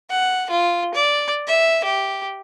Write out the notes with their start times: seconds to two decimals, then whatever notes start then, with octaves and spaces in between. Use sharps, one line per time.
0.10 F#5
0.50 F4
0.94 D5
1.47 E5
1.84 G4